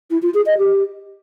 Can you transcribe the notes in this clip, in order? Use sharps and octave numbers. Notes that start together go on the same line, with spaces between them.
E4
F4
G#4
D#5
G4